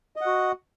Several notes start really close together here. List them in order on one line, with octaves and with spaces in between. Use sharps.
D#5 F#5 F#4